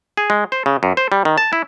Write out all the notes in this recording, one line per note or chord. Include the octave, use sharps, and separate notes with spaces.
G#4
G#3
C5
C#3
F#2
C5
G3
D#3
A5
E4